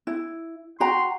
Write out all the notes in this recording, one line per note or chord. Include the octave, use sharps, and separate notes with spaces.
E4
F#4 G5 A#5 C6